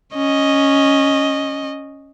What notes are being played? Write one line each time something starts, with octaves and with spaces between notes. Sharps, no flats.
C#4 D#5